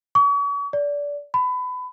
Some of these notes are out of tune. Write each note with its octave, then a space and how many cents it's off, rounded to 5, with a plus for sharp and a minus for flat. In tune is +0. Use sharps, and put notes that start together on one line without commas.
C#6 +40
D5 -25
B5 +25